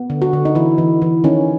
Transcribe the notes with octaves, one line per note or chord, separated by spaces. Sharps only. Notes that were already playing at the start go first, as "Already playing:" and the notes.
Already playing: B3
D3
F#4
D3
D#4
E3 E4
E3
E3
D#3 C#4